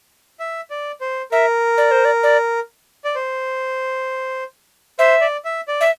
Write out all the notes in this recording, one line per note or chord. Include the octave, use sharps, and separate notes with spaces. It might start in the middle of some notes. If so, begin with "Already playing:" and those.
E5
D5
C5
A#4 E5
D5
C5
D5
D5
D5
C5
C5 E5
D5
E5
D5
E5